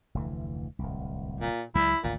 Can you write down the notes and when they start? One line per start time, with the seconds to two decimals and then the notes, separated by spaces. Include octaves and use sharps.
0.15 F1 D2 E3
0.79 D1 C2
1.41 A#2
1.75 C#2 F#3 G#3 E4
2.04 G#1 D2 A#2